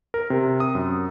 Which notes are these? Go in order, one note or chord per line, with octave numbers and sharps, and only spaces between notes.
A#4
C3
D#6
F#2